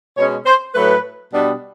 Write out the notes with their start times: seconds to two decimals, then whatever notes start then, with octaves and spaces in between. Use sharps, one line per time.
0.17 B2 G#3 C#4 C#5
0.46 C5
0.74 A2 F#3 A3 B4
1.32 B2 G3 B3 D4